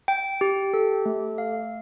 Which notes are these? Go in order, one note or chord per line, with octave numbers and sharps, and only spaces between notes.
G5
G4
A4
A3
F5